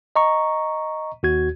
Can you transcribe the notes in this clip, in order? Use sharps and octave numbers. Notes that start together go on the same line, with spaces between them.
D#5 A#5 C#6
D#2 F#4 G#6